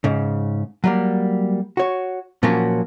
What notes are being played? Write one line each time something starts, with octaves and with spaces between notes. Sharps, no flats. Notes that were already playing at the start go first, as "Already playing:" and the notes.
G#2 C#3
F#3 G3 A#3
F#4 C#5
A#2 F3 F#3 A#3 C#4 F#4